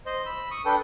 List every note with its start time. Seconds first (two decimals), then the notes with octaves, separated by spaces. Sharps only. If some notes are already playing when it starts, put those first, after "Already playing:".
0.06 C5 D#5
0.26 B5 E6
0.51 C#6 D#6
0.65 D4 A4 B4 G5